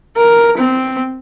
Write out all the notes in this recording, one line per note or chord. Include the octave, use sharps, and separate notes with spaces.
A#4
C4